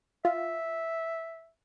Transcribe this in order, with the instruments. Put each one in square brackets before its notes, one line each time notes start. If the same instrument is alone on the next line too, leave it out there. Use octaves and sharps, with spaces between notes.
[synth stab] F4 [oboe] E5